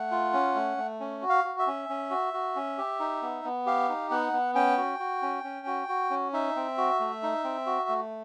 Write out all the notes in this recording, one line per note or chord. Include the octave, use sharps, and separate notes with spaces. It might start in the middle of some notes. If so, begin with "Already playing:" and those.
Already playing: A3 F#5
F4
C#4
A3
A3
C#4
F#4
F5
F#4
E5
C#4
C#4
F#4
F#4
C#4
G4
D#4
B3
B3
G4 F5
D#4
B3 F#5
B3
C#4 G5
F#4
F#4
C#4
C#4
F#4
F#4
C#4
D#4 E5
C4
F#4
A3
D#4
C4
F#4
A3